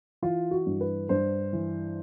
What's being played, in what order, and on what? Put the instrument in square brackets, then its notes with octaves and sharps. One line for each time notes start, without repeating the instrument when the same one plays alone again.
[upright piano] E3 F4
F#4
G2
B4
G2 C5
E3